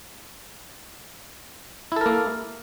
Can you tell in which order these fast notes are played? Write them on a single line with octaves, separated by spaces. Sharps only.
E4 A4 A#4 A#3